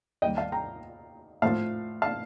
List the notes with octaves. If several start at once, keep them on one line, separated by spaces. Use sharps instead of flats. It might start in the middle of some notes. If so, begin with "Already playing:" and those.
D#2 D#3 G3 D#5 G5
F5 A5
G5 A#5
A2 F3 A3 F5 A5
F5 A5